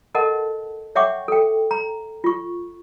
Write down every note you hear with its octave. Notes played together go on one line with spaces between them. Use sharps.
A4 A#4 D#5 F#5 A5
C#5 E5 F#5 G5 C#6 D6
A4 G5
A#5
F4 C#6